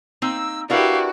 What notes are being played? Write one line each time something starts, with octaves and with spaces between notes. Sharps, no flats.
A#3 C4 D#4 E6
D4 E4 F#4 G4 A#4 B4 F5